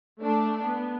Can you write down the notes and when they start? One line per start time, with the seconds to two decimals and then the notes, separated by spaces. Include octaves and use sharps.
0.22 A3 D4
0.65 B3